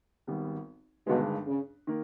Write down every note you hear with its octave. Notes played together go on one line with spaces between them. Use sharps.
G#1 G#2 G3 B3
G1 G2 B2 D#3 G#3
C#3
D#3 A#3